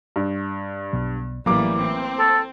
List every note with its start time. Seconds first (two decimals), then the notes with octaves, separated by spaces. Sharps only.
0.16 G2
0.93 B1 B2 F#3
1.46 A1 E3 F#3 G3 A#3 D6
1.79 C4
2.19 A4